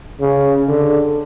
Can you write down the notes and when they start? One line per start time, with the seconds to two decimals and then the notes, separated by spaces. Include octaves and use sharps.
0.21 C#3
0.68 D3